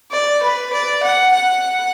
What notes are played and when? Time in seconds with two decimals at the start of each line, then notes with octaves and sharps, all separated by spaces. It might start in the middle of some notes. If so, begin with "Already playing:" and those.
0.11 D5
0.43 B4
0.73 D5
1.03 F#5
1.33 F#5